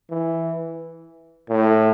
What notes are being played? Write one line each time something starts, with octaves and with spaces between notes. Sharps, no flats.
E3
A2